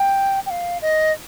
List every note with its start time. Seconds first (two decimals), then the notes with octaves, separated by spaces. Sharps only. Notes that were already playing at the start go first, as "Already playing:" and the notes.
Already playing: G5
0.46 G5
0.50 F5
0.82 D#5